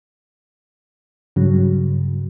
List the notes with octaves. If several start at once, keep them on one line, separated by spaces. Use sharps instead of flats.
G2 C#3 F#3